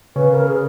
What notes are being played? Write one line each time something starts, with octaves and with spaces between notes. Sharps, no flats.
C#3 B4
A#4
C#3
G#4